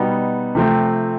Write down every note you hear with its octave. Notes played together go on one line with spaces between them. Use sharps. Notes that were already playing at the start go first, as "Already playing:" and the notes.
Already playing: B2 G3 B3 D#4
C3 F3 A3 C4